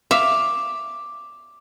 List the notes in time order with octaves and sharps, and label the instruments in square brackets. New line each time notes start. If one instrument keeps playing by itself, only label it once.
[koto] E5 F5 [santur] D6